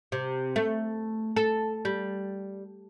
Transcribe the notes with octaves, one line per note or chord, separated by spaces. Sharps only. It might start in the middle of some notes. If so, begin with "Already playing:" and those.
C3
A3
A4
G3